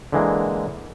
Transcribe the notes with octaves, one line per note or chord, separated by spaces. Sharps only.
D3 E3 G#3 A#3